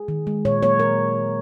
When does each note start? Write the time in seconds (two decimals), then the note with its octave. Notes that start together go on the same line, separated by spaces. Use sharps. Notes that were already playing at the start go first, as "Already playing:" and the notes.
Already playing: G#4
0.08 D#3
0.27 G#3
0.45 A#2 C#5
0.62 F#3 A#3 C#5
0.80 A#4